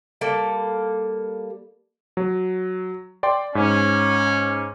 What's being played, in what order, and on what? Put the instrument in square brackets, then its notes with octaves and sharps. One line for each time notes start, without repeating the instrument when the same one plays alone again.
[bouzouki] G3 A#3 A4
[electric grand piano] F#3
D5 G5 C6
[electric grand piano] G#2 [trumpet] C#4